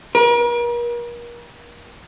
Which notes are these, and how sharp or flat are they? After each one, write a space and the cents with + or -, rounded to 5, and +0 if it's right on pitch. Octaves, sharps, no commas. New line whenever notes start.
A#4 +40